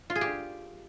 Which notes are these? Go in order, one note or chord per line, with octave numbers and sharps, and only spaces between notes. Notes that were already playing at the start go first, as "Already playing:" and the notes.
F4
G#4
G4